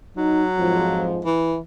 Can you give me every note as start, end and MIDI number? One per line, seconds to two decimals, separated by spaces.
0.17 1.09 54
0.17 0.43 63
0.58 1.23 41
0.58 1.23 44
0.58 1.23 53
1.25 1.59 52